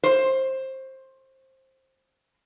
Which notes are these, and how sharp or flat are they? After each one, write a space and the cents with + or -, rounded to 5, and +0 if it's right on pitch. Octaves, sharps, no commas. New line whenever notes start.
C5 +15